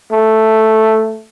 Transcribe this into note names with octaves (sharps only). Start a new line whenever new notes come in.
A3